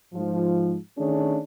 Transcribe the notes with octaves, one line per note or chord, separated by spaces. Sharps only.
G#2 F3
D#3 A3 C#4 D4 G#4